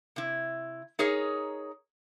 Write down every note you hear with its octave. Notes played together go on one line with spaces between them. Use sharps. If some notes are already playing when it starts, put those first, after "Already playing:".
C3 E4
D#4 G#4 A#4 C#5